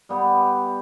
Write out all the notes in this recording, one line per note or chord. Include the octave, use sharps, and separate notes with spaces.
G3 B3 G4